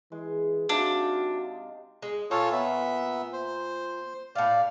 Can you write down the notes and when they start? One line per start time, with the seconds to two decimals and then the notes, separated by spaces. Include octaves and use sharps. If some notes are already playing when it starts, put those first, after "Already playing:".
0.12 E3 G#3
0.69 C3 D4 D#4 F#4 F5
2.02 G#3
2.31 A#2 F4 A4 C#5
2.52 B3 E5
3.33 C5
4.35 A2 D5 F5